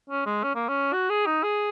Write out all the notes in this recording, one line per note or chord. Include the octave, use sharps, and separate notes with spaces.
C#4
G#3
C#4
A#3
C#4
F#4
G#4
D#4
G#4